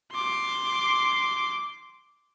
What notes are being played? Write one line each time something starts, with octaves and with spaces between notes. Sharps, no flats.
C6 D6